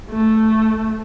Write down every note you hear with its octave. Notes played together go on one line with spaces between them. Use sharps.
A3